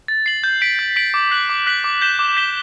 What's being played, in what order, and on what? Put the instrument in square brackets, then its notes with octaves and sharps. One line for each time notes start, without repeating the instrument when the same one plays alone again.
[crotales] A6
C7 F#7
G6
B6 D7 F#7
G6
B6 D7 F#7
D6
F#6 B6 F#7
D6
F#6 B6 F#7
D6
G6 B6 E7 G7
D6
G6 B6 E7 G7